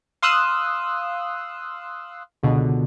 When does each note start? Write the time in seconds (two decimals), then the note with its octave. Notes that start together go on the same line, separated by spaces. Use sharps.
0.22 F5 C6 D#6 E6 F#6
2.43 C#2 B2 D3